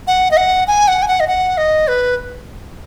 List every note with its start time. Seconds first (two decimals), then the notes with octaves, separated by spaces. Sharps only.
0.07 F#5
0.31 D#5
0.37 F#5
0.68 G#5
0.88 F#5
1.02 G#5
1.08 F#5
1.20 D#5
1.27 F#5
1.58 D#5
1.88 B4